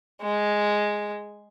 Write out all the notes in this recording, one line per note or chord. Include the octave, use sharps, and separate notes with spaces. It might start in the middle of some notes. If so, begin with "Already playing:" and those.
G#3